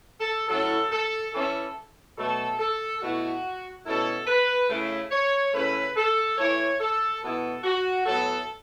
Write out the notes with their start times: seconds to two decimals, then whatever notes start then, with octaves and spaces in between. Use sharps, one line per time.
0.21 A4
0.49 A2 F#3 C#4 E4 A4
0.91 A4
1.33 E3 C#4 E4 A4
2.17 B2 F#3 A3 A4
2.59 A4
3.01 B2 A3 E4 F#4
3.86 B2 A3 C#4 E4 A4
4.27 B4
4.70 C#3 A3 E4
5.11 C#5
5.53 C#3 A3 C#4 E4 B4
5.96 A4
6.38 E3 A3 E4 C#5
6.80 A4
7.22 B2 B3 E4 A4
7.64 F#4
8.06 A2 F#3 B3 E4 A4